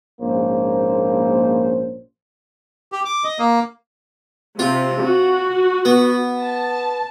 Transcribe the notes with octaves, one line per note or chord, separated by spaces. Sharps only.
A#1 G#2 A#3 C#4 C5
G4
D6
D#5
A#3
C3 F4
F#4
B3
A5